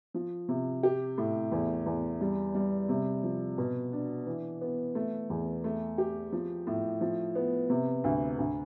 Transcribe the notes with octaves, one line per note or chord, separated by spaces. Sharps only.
F3
C3
G4
A2
E2
E2
G3
G3
C3
F3
B2
D4
E3
B3
A3
E2
A3
G4
F3
A2
F3
B3
C3
D2
D2